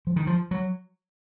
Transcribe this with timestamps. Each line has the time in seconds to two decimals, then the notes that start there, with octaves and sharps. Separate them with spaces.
0.07 F3
0.16 D#3
0.27 F3
0.51 F#3